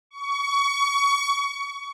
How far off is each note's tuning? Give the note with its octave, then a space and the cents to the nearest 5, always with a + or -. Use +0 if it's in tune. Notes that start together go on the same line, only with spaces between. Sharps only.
C#6 +25